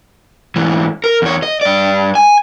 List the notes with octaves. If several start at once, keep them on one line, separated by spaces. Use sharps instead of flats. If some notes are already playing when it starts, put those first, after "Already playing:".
G#2 E3
A#4
E2 C#5
D#5
G2 D5
G#5